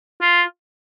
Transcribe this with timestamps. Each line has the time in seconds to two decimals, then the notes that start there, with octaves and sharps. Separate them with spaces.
0.21 F4